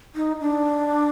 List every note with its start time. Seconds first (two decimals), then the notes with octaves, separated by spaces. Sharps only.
0.15 D#4
0.41 D4